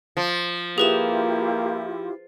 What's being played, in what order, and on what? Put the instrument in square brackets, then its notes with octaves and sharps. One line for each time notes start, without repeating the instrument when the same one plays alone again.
[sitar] F3
[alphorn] A#3 [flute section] E4 F4 G4 [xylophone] G#4 B4 E7